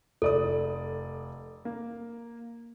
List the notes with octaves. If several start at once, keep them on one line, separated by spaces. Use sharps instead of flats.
F1 A4 D5 D#6
A#3